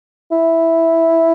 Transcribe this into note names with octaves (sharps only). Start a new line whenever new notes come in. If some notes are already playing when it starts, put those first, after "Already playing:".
E4